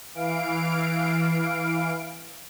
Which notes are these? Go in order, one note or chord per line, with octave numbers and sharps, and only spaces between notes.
E3 F5 D7